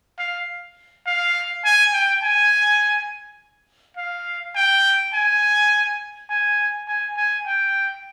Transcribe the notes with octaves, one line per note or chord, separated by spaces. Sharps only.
F5
F5
G#5
G5
G#5
F5
G5
G#5
G#5
G#5
G#5
G5